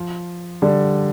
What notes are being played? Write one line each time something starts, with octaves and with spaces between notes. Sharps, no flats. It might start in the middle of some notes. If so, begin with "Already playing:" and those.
Already playing: F3
D3 G3